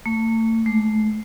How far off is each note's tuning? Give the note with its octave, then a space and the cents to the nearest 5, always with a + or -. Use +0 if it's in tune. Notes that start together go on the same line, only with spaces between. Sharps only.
A3 +40
A3 -35